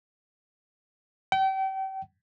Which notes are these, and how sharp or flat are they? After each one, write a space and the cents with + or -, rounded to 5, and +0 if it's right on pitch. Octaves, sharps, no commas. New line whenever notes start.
G5 -35